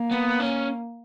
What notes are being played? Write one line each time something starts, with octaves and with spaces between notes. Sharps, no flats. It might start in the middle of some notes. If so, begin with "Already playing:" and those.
Already playing: A#3
B3
C#4